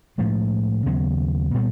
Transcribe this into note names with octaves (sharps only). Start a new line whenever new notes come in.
A2 F3 G#3
D#2 C#3 F#3 B3
A#2 G3 B3